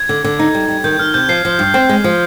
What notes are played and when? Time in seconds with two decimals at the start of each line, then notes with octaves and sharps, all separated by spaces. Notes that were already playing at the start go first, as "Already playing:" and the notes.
Already playing: G#6
0.09 D3
0.24 D3
0.39 D#4
0.54 G3
0.68 G3
0.84 D#3 G6
0.99 D#3 F6
1.14 C3 G6
1.29 F3 C7
1.45 F3
1.59 G2
1.74 C4
1.89 G#3
2.04 F3